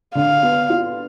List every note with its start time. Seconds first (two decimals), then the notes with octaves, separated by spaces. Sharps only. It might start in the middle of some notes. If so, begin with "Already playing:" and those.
0.15 D3 F5
0.43 B3
0.70 F4